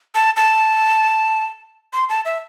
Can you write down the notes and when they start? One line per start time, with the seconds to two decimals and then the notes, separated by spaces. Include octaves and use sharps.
0.15 A5
0.37 A5
1.93 C6
2.09 A5
2.25 E5